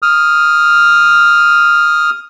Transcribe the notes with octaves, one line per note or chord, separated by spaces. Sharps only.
D#6 F6